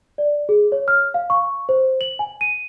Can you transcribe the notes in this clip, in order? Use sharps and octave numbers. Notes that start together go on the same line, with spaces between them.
D5
G#4
C#5
F6
F5
C#6
C5
F#7
G#5
D#7